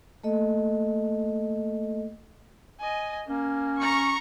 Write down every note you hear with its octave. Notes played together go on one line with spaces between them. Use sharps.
A3 A#3 A4 D#5
D#5 G#5
A#3 C#4
A#5 C#6